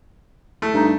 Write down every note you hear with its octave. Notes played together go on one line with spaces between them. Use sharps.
A3
G2 D#4